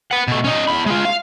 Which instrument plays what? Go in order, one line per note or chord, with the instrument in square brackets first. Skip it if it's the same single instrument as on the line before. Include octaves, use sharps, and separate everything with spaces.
[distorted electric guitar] B4 F#5
B2 A3
C#4 D#4
E2 B5
G#3 F4
F5